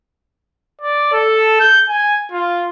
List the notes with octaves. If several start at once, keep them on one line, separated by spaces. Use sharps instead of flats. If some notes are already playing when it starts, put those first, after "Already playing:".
D5
A4
G6
G#5
F4